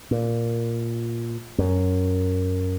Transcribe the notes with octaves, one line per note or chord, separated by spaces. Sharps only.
A#2
F#2